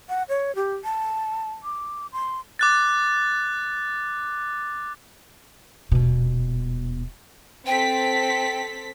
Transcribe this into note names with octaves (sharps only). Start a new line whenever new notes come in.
F#5
C#5
G4
A5
D6
C6
D6 F#6 A6
D#1 B2
C4 A4 G5 B6